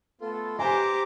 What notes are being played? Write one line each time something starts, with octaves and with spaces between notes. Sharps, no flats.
A3 B3 F4 A4
D#4 G4 B4 C5 G#5 A#5 D6